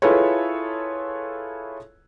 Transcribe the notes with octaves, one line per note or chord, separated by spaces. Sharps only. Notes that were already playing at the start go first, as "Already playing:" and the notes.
E4 F4 G#4 A4 B4 C#5